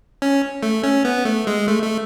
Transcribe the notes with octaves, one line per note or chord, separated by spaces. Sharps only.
C#4
A3
C#4
B3
A3
G#3
A3
A3